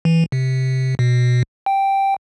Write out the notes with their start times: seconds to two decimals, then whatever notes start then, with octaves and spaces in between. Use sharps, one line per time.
0.05 E3
0.32 C3
0.99 B2
1.66 G5